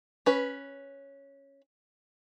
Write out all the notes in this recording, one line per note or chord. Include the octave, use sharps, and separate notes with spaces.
C#4 B4